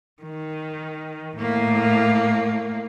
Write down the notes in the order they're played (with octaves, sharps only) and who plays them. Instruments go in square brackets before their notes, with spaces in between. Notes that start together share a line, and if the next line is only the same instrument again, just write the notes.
[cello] D#3
A2 A#3